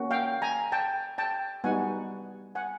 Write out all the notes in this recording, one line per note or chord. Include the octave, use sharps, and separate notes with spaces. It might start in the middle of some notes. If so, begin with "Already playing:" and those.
Already playing: A#3 C#4 F#4
F5 G5
G#5 A#5
G5 A5
G5 A5
G3 B3 D#4 F#4 F#5 G#5
F#5 G#5